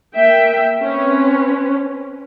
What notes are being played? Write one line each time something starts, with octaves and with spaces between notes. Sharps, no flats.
A#3 E5 G5
C4 C#4 B4